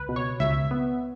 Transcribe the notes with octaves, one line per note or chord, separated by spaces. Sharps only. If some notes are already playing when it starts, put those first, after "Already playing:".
Already playing: C#2 B4
B2
C#5
C#2 E5
B3